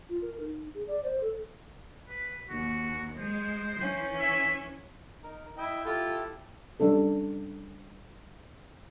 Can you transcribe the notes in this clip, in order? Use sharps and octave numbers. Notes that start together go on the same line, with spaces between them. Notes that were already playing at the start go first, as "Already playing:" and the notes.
F4
A#4
D#4
G#4
D5
C5
A4
B4
D#2 F#4
G#3 C5
E3 C#4
E5
D#4 A#4
E4 D#5 G5
E4 F4 G4 A4
G3 C#4 D4 A4